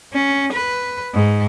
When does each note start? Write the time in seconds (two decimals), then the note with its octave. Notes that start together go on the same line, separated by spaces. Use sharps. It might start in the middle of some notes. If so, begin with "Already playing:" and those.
0.14 C#4
0.53 B4
1.14 G#2